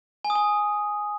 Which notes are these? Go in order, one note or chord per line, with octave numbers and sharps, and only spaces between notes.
G#5
D#6
G#5